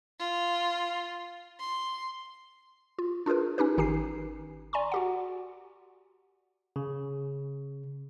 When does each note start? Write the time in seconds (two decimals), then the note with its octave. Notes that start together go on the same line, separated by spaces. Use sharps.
0.19 F4
1.60 C6
2.99 F4
3.26 D4 F4 G#4 A#4 B4
3.58 C#4 D#4 G4 B4
3.77 G#1 D#3 D#4 G4 G#5 C7
4.73 D5 G#5 A#5 C6 C#6
4.92 F#4 G4 F#5
6.76 C#3